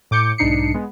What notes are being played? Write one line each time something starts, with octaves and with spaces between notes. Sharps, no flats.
A2 D6 G6 C#7
B1 G#2 D4 D#4 C7 C#7
G#3 B3